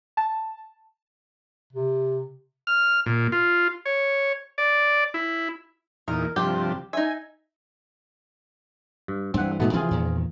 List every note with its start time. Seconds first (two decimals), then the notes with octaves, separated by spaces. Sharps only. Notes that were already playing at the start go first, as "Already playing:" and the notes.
0.17 A5
1.73 C3
2.67 F6
3.06 A#2
3.32 F4
3.86 C#5
4.58 D5
5.14 E4
6.08 E2 A#2 D#4 A#4
6.36 G2 C3 F3 G4
6.93 D#4 E5 G#5
9.08 G2
9.34 G2 E3 C4 F#5
9.60 G#2 B2 D#3 A3 B3
9.73 C3 E3 F3 C4 F4 G#4
9.91 E2 A#2 D#3